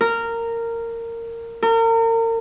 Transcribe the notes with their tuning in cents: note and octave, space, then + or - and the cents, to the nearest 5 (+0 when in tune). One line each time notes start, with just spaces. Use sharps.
A#4 -15
A#4 -35